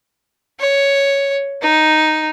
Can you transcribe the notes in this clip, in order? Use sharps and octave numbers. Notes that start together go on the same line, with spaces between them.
C#5
D#4